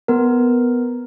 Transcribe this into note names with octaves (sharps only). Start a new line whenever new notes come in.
B3 A#4